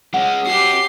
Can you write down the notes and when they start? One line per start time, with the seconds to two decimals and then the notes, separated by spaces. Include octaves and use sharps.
0.14 G#3 C#4 F#5
0.47 C#4 F#4 G4 C7